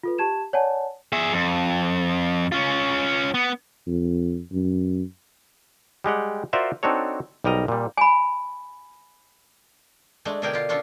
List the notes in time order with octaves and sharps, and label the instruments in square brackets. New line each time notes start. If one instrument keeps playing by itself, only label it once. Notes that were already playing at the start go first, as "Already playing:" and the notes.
[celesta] F4 A4 B4
G4 A5 G#6 E7
C#5 D5 F#5 G#5 A5
[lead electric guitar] G#4 E5
F2
C#4 F4
B3
[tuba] F2
F#2
[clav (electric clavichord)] G3 G#3 G4 F#5
F4 F#4 A#4 C5 D5 E5
C4 D4 D#4 F#4 A4 C#5
B1 G3 A#4 D#5 A#5
A#2 G3
[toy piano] G#5 B5
[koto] G#3 A3 D4
B2 D3 D4 G#4 A#4 G5
F4 G4
C#4 D4 F4 A4